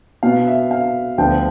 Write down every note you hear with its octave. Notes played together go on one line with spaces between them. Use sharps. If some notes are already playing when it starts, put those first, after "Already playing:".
B2 B3 F5
E5
F5
D2 D3 F3 B3 G5